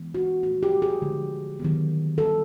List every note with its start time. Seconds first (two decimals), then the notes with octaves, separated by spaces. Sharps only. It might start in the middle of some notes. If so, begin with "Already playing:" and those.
Already playing: E3 G#3 B3
0.15 F#4
0.43 A#2 F3 A3 F#4
0.63 G4
0.82 G#4
1.02 D3 F3 G#3
1.60 D#3 F#3 B3
2.18 D#3 G3 B3 A4